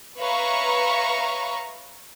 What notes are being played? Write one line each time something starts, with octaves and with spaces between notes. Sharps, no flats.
B4 C#5 E5 F5 A#5 C#6